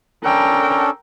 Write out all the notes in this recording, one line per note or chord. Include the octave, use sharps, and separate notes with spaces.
C#4 D4 A4 A#4 G5